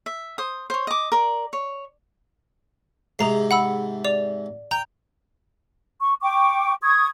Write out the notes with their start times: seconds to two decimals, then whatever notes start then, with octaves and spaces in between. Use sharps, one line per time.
0.06 E5
0.38 C5 D#6
0.70 C5 C#5
0.87 D#5 D6
1.12 A#4 D5
1.53 C#5
3.19 G#2 C3 G#4 A#5 C7
3.51 F#5 B5 E6
4.04 D5 D6 F7
4.71 G5 A#5 G6
6.01 C#6
6.22 G5 C#6 D6
6.82 C#6 D#6 G#6